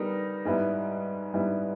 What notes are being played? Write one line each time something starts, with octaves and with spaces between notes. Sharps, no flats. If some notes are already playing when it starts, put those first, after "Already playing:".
Already playing: G3 B3 D#4 A#4
G#2 G3 B3 E4
G#2 G3 B3 E4